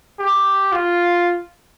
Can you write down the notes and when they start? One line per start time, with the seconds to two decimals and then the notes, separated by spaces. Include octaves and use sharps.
0.19 G4
0.72 F4